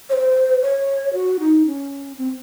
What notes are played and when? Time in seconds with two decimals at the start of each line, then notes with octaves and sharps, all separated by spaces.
0.09 C#5
0.13 C5
0.62 C#5
1.14 F#4
1.40 D#4
1.66 C#4
2.18 C4